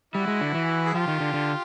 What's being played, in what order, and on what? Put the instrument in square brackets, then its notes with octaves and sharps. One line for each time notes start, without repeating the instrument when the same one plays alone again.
[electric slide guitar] G3 [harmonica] E4 F#4
[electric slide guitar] G#3
D3
E3
[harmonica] G#4
[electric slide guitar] F3 [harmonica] F4 G4
[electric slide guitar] D#3
D3
D3